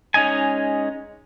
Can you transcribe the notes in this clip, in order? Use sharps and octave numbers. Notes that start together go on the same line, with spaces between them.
G#3 C#4 D#4 D#5 G#5